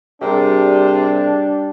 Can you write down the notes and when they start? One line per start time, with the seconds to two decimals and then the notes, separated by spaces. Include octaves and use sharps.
0.22 C3 G3 D4 G4 G#4 A#4